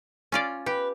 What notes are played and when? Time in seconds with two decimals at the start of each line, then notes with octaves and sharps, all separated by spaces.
0.32 C#4 F4 D5
0.66 G4 B4